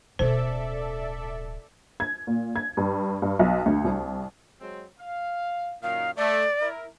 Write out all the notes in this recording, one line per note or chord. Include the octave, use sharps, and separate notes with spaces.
D1 B2 C#4 A4 C5 D5 E5
G#6
A#2
G#6
G2
G2
B1
D2
C2
F#3 G#3 C4
F5
F#2 A#2 D#3 F5
A3 D5
E4 A#4